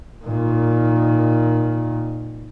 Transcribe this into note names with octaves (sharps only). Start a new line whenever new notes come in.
A#2 D#3